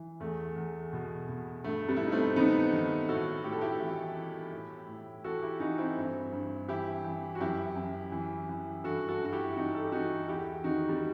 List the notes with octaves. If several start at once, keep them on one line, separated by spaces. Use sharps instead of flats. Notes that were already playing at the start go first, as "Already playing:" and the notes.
Already playing: E3
E2 A3
E2
B2
B2
G2 A3
G3 B3
E4
G2 D#4
A3 C4
D#3 B3 D#4
D#3
A2 F#4 A4
A2 G4
A4
E4 G4
E3
E3
A2
A2
E3 F#4 A4
E4 G4
E3 D#4 F#4
C4 E4
G2
G2
E3 E4 G4
E3
F#4
F#2 E4 G4
F#2
E3
E3
G2 F#4 A4
F#4 A4
G2 F#4
E4 G4
E3 D#4 F#4
A4
G4
E3 D#4 F#4
E2 E4 G4
D#3 D#4 F#4
G3